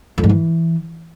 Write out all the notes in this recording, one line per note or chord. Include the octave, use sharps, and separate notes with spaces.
F2
G#2
E3